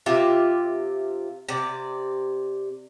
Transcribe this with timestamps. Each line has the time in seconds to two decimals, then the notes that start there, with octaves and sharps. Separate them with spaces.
0.06 C3 F4 G4 E5
1.49 C3 D5